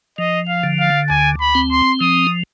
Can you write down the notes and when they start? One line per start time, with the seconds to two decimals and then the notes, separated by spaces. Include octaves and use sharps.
0.18 F3 D#5
0.48 F5
0.63 D3
0.80 F5
1.09 D2 G#5
1.40 B5
1.55 C4
1.71 C6
2.01 F3 D#6